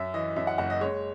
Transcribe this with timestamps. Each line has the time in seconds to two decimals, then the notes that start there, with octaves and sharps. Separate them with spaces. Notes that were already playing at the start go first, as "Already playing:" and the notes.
Already playing: F#2 E5
0.14 E3 D#5
0.36 F#2 E5
0.47 F#5
0.58 F#1 F#5
0.70 D#5
0.81 G#3 C#5